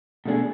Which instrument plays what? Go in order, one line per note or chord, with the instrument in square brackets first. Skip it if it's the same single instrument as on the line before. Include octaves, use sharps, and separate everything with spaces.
[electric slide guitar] B2 A3 D4 G#4